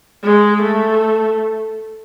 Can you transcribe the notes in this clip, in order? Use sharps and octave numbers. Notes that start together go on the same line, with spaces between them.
G#3
A3